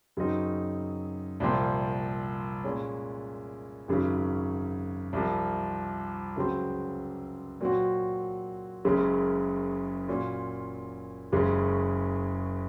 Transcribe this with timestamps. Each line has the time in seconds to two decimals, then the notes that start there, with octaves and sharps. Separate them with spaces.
0.17 F#2 C#3 F#3 C4 D#4
1.40 C2 A#2 F3 C4
2.64 A#2 G#3 C#4
3.88 G#1 F#2 C#3 F#3
5.13 C2 C3 F3
6.36 C#2 C#3 F#3 C4
7.61 A#2 F#3 C4 F#4
8.85 F#1 F#2 C#3 G#3
10.08 A#2 F#3 C#4 F4
11.32 F#1 F#2 C#3 G#3 C#4